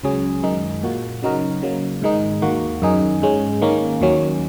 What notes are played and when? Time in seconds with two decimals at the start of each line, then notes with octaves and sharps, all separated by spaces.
0.03 C#2 C#3 F#3 C#4 G#4
0.43 F#2 D#3 G#3 D#4
0.83 A#2 A#3 F#4
1.23 C#3 F#3 D#4 F#4 A#4
1.62 C#3 F#3 A#3
2.02 G#2 D#3 G#3 D#4
2.42 D#2 D#3 A#3 F#4
2.82 F#2 D#3 F#3 D#4 G#4
3.22 G#2 G#3 C#4
3.62 D#3 A#3 C#4
4.01 D#2 D#3 F#3 C#4